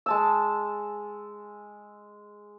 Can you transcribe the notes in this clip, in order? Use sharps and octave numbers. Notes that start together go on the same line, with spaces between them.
G#3 A5 E6